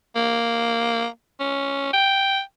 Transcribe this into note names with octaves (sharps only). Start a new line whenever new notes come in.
A#3
C#4
G5